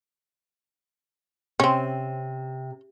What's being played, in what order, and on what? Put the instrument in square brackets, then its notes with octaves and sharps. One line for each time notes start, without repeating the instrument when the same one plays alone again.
[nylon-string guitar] C3 [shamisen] C4 C#4